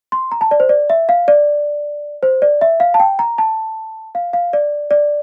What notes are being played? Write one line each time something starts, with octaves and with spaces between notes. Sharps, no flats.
C6
A#5
A5
D5
C5
D5
E5
F5
D5
C5
D5
E5
F5
A5
G5
A#5
A5
F5
F5
D5
D5